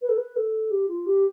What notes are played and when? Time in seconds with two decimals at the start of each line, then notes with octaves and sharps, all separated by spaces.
0.01 B4
0.09 A4
0.17 B4
0.36 A4
0.70 G4
0.88 F4
1.06 G4